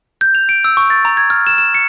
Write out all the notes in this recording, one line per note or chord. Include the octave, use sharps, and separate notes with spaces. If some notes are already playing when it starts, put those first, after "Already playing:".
G6
F7
D7
E6
C#6
A6
A#5
G#6
F6
E7
E7
C#7